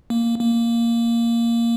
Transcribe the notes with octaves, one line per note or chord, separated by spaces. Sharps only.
A#3
A#3